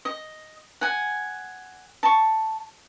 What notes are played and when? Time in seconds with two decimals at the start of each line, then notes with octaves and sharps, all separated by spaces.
0.05 D#5
0.81 F#5 G#5
2.03 A5 C#6